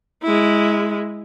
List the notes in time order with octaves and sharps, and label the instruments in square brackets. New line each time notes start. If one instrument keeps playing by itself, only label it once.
[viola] G#3 E4